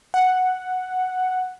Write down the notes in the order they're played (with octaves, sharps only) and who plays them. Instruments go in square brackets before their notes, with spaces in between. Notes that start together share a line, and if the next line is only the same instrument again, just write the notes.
[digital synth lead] F#5